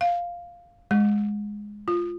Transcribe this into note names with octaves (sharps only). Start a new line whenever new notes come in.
F5
G#3
F4